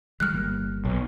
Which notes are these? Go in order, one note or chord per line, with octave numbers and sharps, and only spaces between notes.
D#3 G3 G#3 F6 F#6
G1 G3 A#3
B1